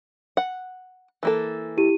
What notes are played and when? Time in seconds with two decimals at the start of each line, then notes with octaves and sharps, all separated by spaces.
0.37 F#5
1.23 E3 A#3 A4
1.77 E4 G4 D#7